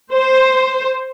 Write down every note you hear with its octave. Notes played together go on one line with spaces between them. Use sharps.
C5